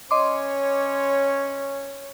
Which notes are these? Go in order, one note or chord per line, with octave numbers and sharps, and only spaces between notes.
C#4 C#5 D#5 C6 D6